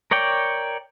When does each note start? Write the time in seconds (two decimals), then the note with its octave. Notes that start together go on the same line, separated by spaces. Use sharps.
0.11 A#4 C#5 D5 G5